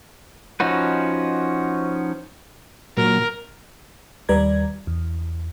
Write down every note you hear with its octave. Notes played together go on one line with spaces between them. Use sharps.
F3 C#4 D#4 F#4 B4
A#2 F#3 A#4
D#2 G3 B4 D5 A#5 G#6
E2